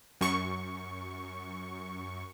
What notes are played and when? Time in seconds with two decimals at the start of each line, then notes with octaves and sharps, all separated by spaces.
0.21 F#2 C#6